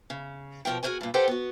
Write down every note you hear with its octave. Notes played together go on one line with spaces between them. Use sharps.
C#3
B2 F3 A#3 A#4 G5
F#4 G#4 A#4 C5 C#5 G#5
G2 A#2
G4 A4 B4 C5 F#5 G5
B3 F#4